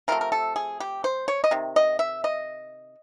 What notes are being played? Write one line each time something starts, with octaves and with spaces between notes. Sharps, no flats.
C3 F3 A3 A#4
A#4
A4
G#4
G4
C5
C#5
D#5
C3 D#3
D#5
E5
D#5